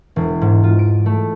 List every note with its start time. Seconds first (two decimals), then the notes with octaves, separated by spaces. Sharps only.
0.16 E1
0.42 G#2
0.64 F4
0.79 D7
1.06 A3